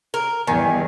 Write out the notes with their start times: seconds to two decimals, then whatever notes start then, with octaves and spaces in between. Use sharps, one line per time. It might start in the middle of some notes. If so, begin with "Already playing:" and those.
0.14 A#4
0.47 E2 G2 D#3 G#5